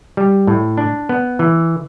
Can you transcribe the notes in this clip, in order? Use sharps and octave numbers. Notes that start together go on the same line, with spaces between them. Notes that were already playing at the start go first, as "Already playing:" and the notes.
G3
A2
D4
B3
E3